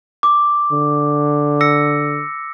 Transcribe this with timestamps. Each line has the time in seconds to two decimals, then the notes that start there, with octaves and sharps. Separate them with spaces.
0.23 D6
0.71 D3
1.61 E6 A#6 C#7